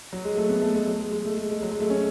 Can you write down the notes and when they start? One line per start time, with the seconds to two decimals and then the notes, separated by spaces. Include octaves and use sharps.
0.13 F#3
0.25 G#3
0.37 A3
0.49 B3
0.62 A3
0.75 G#3
0.87 F#3
1.00 G#3
1.12 G#3
1.25 A3
1.37 G#3
1.50 G#3
1.63 F#3
1.71 G#3
1.80 A3
1.90 C#4